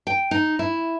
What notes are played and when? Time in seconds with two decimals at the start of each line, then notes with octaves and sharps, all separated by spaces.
0.07 G5
0.31 D#4
0.59 E4